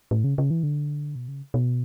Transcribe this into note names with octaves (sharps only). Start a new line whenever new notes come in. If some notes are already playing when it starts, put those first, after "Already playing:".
A2
C#3
C#3
E3
D3
B2
C#3
B2